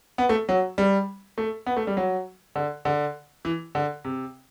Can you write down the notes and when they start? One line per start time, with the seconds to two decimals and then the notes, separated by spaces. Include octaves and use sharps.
0.18 B3
0.29 A3
0.49 F#3
0.78 G3
1.38 A3
1.66 B3
1.77 A3
1.87 G3
1.97 F#3
2.56 D3
2.85 D3
3.45 E3
3.75 D3
4.05 C3